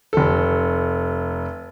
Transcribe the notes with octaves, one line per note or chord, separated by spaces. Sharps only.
F1 A4